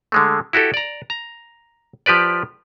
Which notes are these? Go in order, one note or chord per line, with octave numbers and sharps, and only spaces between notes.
D3 G#3 A3
E4 F#4 G4 A4
D5 A#5
A#5
F3 G4 B4 D5